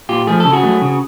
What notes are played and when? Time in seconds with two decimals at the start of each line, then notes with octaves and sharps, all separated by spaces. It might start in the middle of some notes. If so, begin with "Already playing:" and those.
0.09 A#2 F4 G4
0.27 F3 A3 G#4
0.40 C#3 A4
0.53 F#4 G#4
0.63 F#3 A3
0.81 C#3